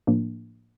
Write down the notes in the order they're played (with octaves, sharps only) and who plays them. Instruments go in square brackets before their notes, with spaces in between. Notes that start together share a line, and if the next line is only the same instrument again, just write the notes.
[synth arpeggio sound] A2 F3 A#3 D4